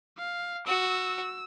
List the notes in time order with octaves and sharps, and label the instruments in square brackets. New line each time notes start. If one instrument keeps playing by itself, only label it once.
[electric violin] F5
[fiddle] F#4 [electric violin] E6